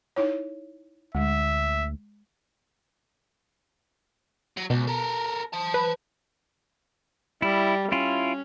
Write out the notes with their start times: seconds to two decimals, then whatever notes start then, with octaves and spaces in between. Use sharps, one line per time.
0.16 D#4 E4 C#5
1.15 D2 G#3 E5
4.57 F#3
4.70 C#2 B2
4.87 A4 A#4
5.53 C5 A5
5.74 B4
7.42 G3 E4
7.92 C#4 E4 F4